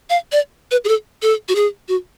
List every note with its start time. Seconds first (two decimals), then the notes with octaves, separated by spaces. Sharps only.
0.10 F5
0.32 D5
0.71 B4
0.84 G#4
0.88 A4
1.22 A4
1.49 F#4
1.55 G#4
1.88 F#4